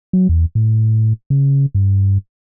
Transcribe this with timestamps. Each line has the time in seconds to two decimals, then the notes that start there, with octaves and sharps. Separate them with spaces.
0.13 F#3
0.29 E2
0.55 A2
1.30 C#3
1.75 G2